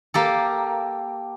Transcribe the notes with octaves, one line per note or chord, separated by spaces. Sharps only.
A#3 G4 A4